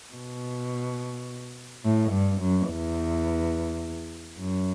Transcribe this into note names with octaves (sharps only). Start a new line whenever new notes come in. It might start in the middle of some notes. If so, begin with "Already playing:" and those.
B2
A2
G2
F#2
E2
F#2